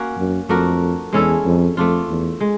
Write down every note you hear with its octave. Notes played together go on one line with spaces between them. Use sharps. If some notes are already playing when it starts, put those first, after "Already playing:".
Already playing: A#3 C#4 F#4
F#2
F2 A3 D4 F#4 A#4
E2 G#3 C#4 E4 A4
F2
F2 A3 D4 F4
E2
G#3